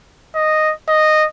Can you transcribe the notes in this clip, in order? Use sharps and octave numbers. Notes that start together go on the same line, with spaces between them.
D#5
D#5